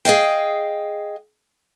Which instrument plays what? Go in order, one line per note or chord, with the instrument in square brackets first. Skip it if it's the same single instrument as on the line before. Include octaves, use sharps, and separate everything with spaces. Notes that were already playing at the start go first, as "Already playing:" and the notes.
[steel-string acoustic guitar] G#4 D#5 F5 G5